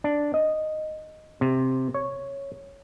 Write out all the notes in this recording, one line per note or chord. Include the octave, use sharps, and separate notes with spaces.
D4
D#5
C3
C#5